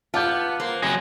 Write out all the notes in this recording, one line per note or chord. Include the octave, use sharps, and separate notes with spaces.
B3 F4 A5 D6 G6
A#3 C5
F#3 C4 G#4 A#6